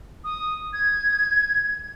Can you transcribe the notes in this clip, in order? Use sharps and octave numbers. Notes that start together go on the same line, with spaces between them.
D#6
G#6